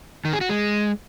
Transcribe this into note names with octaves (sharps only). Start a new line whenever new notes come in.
D#3
G#4
F#4
G#3